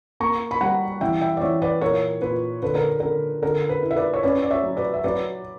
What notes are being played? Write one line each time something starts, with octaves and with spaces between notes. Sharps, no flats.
A#3 A#5 C#6
B5
G3 F#5 A#5
E3 E5 G5
E5 G5
D5
E3 C#5 E5
B4 D5
A#2 A#4 C#5
A#2 B4
D3 B4
A#4
D3 A#4
D3 A#4
B4
E4
E5
B4 D5
C#5
C#4 B4 D5
D5
C#5 E5
F#3
B4 D5
E5
F#3 B4 D5